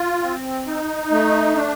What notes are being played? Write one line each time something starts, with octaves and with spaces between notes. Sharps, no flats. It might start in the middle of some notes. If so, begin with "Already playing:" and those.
Already playing: F4
C4
D#4
A3
D4